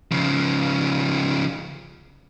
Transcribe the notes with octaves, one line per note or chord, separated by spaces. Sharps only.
C#3 F3